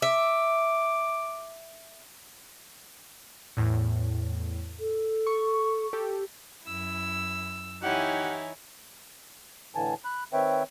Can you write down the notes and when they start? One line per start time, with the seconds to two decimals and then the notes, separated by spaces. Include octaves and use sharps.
0.02 E5 D6
3.57 E2 A2
4.80 A4
5.27 C#6
5.93 G4 A4
6.65 F#2 E4 E6
7.83 E3 D#4 E4 G4 C#5 F#5 G#5
9.75 A2 D3 E3 G#5 A5
10.05 B5 F#6
10.33 D#3 C4 B4 C#5 E5 G5